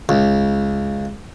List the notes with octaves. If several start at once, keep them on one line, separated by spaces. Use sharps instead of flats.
C#2